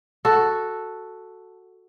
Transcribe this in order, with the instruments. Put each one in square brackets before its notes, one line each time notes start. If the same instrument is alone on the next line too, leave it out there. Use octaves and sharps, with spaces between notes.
[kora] F#4 A4